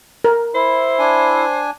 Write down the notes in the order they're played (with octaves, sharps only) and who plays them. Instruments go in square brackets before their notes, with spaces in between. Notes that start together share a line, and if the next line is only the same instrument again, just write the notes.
[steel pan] A#4
[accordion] E4 [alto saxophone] C5
[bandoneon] D4 G#5